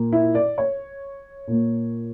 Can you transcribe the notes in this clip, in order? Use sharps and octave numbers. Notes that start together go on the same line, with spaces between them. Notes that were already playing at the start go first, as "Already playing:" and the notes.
Already playing: A#2 A#3
E4
D5
C#5
A#2 A#3